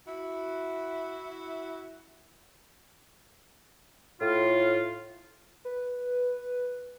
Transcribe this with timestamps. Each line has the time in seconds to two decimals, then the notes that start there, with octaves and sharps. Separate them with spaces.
0.07 E4 F#4
4.21 A2 F4
5.65 B4